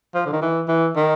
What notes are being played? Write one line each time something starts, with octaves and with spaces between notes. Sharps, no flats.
F3
D3
D#3
E3
E3
D#3